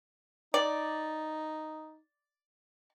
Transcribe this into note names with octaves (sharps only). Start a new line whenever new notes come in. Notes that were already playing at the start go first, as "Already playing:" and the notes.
D#4 D5